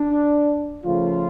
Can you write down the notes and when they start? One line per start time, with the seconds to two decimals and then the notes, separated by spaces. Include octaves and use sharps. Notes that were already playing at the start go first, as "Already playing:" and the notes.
Already playing: D4
0.84 C#3 F3 A3 F4